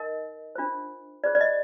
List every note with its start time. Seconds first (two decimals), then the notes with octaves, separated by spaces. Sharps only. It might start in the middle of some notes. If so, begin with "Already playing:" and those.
Already playing: D#4 A#4 D#5
0.55 D4 F4 C5
1.24 F4 G#4 C5 D5
1.35 D5
1.41 D#5